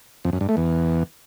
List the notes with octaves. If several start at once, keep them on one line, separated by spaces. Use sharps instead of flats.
F2
F#2
G2
A3
E2